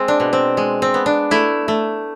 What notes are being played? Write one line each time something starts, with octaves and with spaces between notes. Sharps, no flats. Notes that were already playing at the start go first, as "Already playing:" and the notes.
Already playing: G#3 C4
D4
B2
C4
G#3
C4
B3
D4
A3 E4
A3